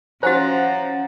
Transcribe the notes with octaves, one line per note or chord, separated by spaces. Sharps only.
F3 C#4 F#4 C5 F#5 A#5 A6